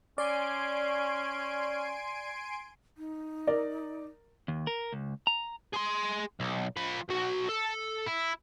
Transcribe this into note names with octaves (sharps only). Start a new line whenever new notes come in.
C#4 D5 G#5 C6 D7
D#4
A#4 D5
D#2
A#4
C#2
A#5
G#4 C6
B1
F3 B5
B1 F#4
A4
E4